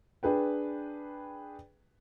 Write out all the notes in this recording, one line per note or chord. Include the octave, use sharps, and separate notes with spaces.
D4 G#4 B4 G5